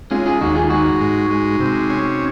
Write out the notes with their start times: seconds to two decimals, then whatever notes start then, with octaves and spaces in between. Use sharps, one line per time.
0.11 G#3 C#4 F4
0.26 F4 G#4
0.41 D#2 D#4 F#4
0.55 F4 G#4
0.70 G#3 D#4 F#4
1.00 G#2
1.30 G#3
1.60 C3
1.90 C#4